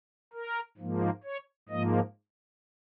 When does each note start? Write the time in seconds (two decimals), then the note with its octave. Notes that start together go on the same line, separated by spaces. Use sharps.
0.33 A#4
0.77 G#2 F3 A#3
1.24 C#5
1.69 G#2 F3 A#3 D#5